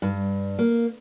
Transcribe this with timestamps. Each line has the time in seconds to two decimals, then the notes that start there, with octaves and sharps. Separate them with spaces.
0.02 G2
0.59 A#3